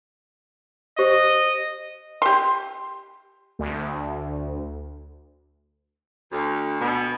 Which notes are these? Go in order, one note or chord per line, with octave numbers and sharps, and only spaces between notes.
G4 C5 D#5
G4 C6
D2
D2
B2